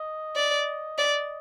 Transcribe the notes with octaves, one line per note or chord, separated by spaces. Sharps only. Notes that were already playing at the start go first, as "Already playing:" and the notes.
Already playing: D#5
D5
D5